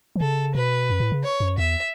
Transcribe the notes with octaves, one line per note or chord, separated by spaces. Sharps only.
E3
C#3 A4
B2 B4
F#2
A2
C#3
C#5
F#2
E2 E5